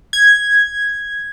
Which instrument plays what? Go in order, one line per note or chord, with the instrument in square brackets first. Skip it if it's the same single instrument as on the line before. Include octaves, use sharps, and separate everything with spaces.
[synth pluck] G#6